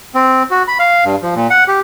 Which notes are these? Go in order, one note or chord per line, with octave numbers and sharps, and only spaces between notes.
C4
F#4
B5
F5
G2
F3
A#2
F#5
G4